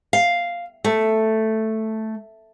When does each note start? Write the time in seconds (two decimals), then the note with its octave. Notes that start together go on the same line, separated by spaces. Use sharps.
0.13 F5
0.84 A3